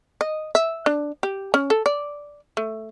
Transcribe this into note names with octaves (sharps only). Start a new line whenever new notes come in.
D#5
E5
D4
G4
C#4
A4
D5
A3